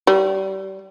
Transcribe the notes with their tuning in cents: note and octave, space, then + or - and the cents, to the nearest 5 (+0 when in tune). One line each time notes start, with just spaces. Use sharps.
G3 -30